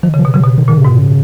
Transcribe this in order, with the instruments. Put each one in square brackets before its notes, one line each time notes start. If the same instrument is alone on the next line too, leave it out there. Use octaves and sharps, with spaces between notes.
[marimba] D#3 [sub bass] F3
[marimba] C#3
[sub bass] F3
[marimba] B2
[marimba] C#3 [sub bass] F#3
[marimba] B2
[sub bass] D#3
[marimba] A#2 [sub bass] D#3
[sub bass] C#3
[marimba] G#2 [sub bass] B2
[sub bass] C#3